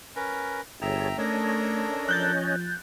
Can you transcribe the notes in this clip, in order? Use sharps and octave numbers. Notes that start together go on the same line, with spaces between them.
C#4 A#4 B4
G1 G#4 C#5 E5 G5 A5 A#5
A3 C#4 D4 A4 A#4 C#5 D#5
F3 F#6 G6 A6